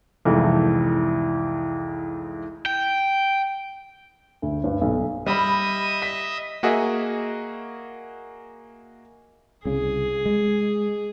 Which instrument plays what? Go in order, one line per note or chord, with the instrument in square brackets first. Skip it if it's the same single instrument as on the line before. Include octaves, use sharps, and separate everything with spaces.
[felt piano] C2 F2 G#2 E3 A3
[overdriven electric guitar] G5
[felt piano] D2
G2
B1
[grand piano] G3 B5 [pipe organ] D#5 E5 D#6
[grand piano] B6
[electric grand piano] A#3 F#4 G#4 D#5 E5
[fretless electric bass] C2 C#3 [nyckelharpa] G#4
[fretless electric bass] G#3